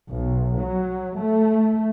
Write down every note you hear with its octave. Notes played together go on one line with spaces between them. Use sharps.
B1
F#3
A3